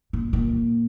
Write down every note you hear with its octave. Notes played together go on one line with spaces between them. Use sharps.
A#2
A#2